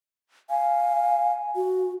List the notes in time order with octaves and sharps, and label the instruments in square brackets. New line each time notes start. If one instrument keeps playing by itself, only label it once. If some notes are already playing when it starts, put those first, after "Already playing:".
[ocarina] F5 [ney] G#5
[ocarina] F#4